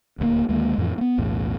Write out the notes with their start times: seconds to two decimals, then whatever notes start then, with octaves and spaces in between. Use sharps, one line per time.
0.18 D#1 D2 G3 A#3
0.49 D2 D#3 G#3 A#3
0.78 F2 A2 E3 F3
0.98 A#3 B3
1.18 B1 E2 A2